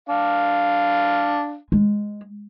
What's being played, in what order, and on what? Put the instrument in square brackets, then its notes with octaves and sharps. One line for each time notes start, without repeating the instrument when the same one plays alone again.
[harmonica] D4 F5
[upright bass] G#3